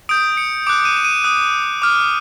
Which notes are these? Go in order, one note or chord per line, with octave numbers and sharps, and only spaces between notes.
D#6 G6 D7
C#7
D6 F#6 D7
D#7
E7
D#7
D#6 F#6
D6 F6